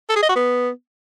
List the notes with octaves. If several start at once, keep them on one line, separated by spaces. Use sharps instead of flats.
A4
G#4
D#5
F#4
B3